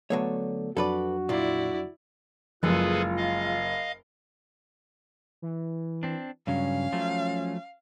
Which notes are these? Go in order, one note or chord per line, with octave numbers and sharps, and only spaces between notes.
D3 F#3 A3 B3 A4 C#5
F2 F#3 D4 F#4 A4 B4 D5
A#2 E4 F4 D5
F#1 F3 G#3 F4 G#4 A4 B4
D#5 F5
E3
C4 D4
G2 C#3 F#3 C#4 F5
F3 F#3 A3